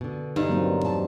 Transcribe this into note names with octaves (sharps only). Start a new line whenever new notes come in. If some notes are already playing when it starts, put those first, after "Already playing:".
B2 D3
G2 D#4
F#3 A#3 C4
E2 A3 A5